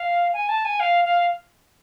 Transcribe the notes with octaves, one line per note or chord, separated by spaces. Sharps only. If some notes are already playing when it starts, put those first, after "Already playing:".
Already playing: F5
G#5
A5
G#5
F5
F5